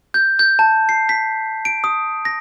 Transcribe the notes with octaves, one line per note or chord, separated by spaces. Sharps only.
G6
G6
A5
C7
B6
D7
D#6
A#6